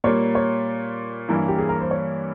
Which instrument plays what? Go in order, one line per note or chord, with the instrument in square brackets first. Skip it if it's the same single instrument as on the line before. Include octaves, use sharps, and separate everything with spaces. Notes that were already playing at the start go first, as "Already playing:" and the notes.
[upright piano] A#2 G3 A#3 [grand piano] C#5
[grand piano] C#5
[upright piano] G2 E3 A#3 E4
[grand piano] G4
G#4
A#4
C5
C#5